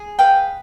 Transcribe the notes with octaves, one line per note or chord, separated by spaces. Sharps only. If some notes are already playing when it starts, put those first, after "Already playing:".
Already playing: G#4
B4 F5 G5